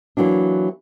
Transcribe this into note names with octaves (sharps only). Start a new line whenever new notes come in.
E3 F#3 A#3 D4